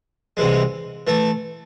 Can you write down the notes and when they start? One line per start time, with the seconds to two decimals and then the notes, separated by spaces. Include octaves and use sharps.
0.37 C2 C3 E3 G#3
1.07 E3 A3